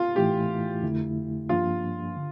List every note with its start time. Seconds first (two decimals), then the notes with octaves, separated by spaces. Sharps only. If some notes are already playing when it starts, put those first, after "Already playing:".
Already playing: F4
0.15 A2 E3 A3 E4 G4
0.82 F2 D3 A3 E4
1.49 G2 F3 A#3 D4 F4
2.17 D3